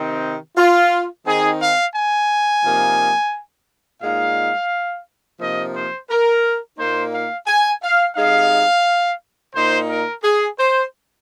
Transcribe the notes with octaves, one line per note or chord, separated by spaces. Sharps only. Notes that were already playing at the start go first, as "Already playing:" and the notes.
Already playing: C3 D#3 C4 D#4
F4
D#3 C4 D#4 G#4
F5
G#5
C3 F3 A#3 D#4
A#2 G#3 D#4 F5
C3 F3 A#3 D#4 D#5
C5
A#4
A#2 A#3 D#4 C5
F5
G#5
F5
C3 G#3 D#4 F5
A#2 A#3 D#4 C5
A#4
G#4
C5